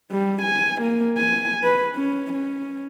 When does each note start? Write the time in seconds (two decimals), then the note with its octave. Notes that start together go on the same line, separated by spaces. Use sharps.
0.12 G3
0.42 G#5
0.82 A#3
1.17 G#5
1.64 B4
1.95 C#4
2.33 C#4